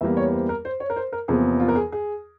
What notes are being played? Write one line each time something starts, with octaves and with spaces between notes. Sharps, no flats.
E2 E3 G3 A#3 E5
C#5
C5
A#4
C5
C#5
A#4
C5
A#4
E2 C3 F3 A#3 G#4
F4
A#4
G#4
G#4